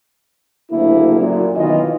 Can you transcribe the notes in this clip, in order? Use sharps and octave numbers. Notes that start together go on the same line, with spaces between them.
F#1 D2 A3 A#3 E4
F#2 A#2
B1 D#3 E3 F4 D#5